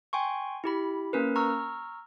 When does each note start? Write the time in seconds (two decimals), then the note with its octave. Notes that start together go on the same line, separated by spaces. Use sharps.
0.13 G5 G#5 C6 C#6
0.64 E4 G4 B5
1.13 A#3 C#4 A#4 B4
1.36 A#5 C#6 E6 F6